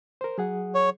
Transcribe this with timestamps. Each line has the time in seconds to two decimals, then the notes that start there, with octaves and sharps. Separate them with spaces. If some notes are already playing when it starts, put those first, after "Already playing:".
0.21 A#4 C5
0.38 F#3 G#4 F#5
0.75 C#5